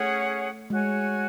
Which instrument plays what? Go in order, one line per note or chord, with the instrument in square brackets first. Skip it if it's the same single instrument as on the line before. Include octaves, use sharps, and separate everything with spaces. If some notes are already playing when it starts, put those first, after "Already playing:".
Already playing: [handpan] A3 [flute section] C#4 G#4 C#5 F#5
[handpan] G#3 [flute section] F#4 C#5 G#5